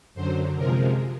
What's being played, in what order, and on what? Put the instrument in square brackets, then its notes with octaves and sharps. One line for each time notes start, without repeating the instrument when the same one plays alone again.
[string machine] F#2 D3 F#3 C5
C3 F3 G#3 A#4